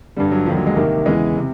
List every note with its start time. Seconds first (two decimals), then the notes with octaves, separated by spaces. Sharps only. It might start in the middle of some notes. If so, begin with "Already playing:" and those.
0.17 G2 D3 G3
0.31 F#3
0.46 D#2 D3 F3
0.57 F#3
0.67 G#3
0.76 C2 C3 D#3 A#3
1.06 E2 C#3 E3 G#3
1.37 C3